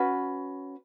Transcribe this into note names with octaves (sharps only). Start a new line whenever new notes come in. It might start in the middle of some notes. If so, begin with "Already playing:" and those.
Already playing: C#4 F#4 B4